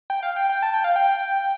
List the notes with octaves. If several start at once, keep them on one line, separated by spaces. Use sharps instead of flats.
G5
F5
G5
G5
A5
G5
F5
G5